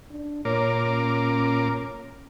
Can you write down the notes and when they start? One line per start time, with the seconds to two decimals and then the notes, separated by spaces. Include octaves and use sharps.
0.11 D4
0.45 A#2 A#4 C#5 D6
0.87 C#4